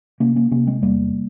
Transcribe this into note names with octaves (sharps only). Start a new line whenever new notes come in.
C3 A#3 C#4
A#3 C#4
C3 A#3 C#4
G#3 C4
E2 G3 A#3